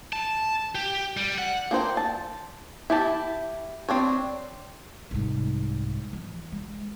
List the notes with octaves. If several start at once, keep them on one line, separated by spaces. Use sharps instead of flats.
A5
G4
G3
F#5
A#3 D4 C5 G5
A5
E4 G4 A5
C4 D4 C#5
C2 G#2
E3 F3
G#3